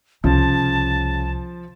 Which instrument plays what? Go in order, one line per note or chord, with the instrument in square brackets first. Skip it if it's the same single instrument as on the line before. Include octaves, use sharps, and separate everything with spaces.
[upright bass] C2 [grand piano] C#3 [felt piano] F3 [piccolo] A5